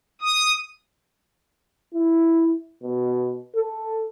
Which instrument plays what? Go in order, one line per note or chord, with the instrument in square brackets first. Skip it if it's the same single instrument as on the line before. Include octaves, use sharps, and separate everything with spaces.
[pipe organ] D#6
[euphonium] E4
B2
A4